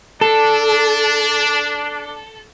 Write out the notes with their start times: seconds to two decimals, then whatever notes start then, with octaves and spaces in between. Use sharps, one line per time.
0.21 D4 A4